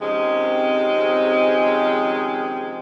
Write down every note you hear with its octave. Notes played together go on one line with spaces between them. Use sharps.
C3 D#3 F3 G#3 C4 C#4